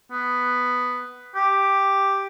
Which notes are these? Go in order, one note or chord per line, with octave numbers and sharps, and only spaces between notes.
B3
G4